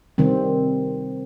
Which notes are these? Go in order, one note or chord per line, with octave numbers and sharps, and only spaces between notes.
C3 D#3 G3 C4